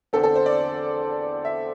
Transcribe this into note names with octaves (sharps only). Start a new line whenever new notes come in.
E2 D3 C4 A4
A4
C5
D5
E5